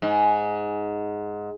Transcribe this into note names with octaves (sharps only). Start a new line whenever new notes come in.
G#2